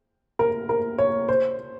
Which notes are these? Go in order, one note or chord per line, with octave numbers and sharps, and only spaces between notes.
A#4
A#4
C#5
C5